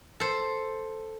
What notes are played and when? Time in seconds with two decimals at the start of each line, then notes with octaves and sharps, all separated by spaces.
0.20 A4 C5